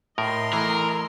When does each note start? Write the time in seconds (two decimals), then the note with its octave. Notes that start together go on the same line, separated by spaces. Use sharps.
0.18 A2 A#4 D#5 A#5 C6
0.53 E3 A3 E4 A#4